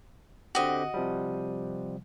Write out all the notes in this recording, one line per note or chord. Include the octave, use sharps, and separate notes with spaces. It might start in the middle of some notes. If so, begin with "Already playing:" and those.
D3 C4 F#4 G4 D#5
C3 F3 G3